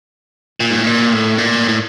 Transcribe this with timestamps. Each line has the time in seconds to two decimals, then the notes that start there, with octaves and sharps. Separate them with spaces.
0.60 A#2
0.71 G#2
0.78 A2
0.87 A#2
1.12 A2
1.38 A#2
1.68 A2